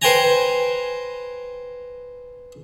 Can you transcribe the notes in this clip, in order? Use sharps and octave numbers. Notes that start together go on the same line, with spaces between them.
B4 C5 G5 G#5 A#5